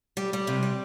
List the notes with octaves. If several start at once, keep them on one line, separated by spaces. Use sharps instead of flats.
G3
G3
C3
G3